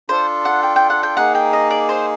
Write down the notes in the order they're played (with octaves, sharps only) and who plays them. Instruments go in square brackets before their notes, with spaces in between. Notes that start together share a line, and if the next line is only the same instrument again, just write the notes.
[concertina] D4 F4 A4 [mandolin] C5
[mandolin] F#5
G5
G5
F#5
G5
[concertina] A#3 D#4 G#4 [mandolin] F#5
[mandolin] G5
D#5
D5
C5